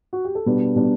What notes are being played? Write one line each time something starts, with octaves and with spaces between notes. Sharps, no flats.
F#4
G4
A4
B2 G3 D4 B4
B2 G3 D4